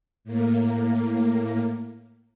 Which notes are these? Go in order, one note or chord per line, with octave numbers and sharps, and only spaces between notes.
A2 A#3